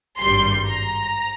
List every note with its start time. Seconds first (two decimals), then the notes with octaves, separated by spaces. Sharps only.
0.21 G#1 G2 G3 C6
0.67 A#5